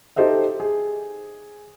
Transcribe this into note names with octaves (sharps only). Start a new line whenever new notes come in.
D#4 G4 A4 C5 D#5 E5
G#4